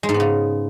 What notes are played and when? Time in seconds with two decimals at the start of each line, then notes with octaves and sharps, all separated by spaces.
0.03 G#3
0.09 G#2
0.14 B3
0.20 C#3